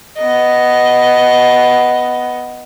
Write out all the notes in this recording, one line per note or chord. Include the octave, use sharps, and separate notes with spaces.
B3 D#5